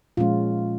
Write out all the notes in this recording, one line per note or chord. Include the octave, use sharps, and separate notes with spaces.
A#2 F3 G#3 C#4 F4